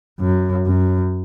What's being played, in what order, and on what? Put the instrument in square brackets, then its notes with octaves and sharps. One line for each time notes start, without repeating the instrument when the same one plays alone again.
[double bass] F#2
F#2